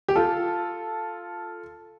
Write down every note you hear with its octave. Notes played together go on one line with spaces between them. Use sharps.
G4
F4 A4